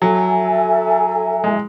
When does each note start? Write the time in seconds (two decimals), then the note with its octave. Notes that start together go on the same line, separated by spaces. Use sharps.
0.01 F#3 A4 E5 G#5
1.44 G#3